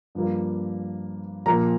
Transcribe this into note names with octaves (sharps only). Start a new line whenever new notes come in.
G2 F3 A#3
A#1 A#2 F3 A#3 A#5